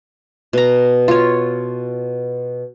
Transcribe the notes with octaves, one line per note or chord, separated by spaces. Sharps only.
B2 A#5
F4 C#5